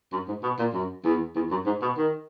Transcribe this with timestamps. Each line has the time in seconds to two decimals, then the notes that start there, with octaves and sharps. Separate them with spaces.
0.12 F#2
0.28 G#2
0.43 B2
0.59 A#2
0.73 F#2
1.04 E2
1.35 E2
1.50 F#2
1.65 G#2
1.82 B2
1.97 D#3